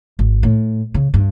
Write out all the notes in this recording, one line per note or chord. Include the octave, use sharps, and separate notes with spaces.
G#1
A2
C#3
G2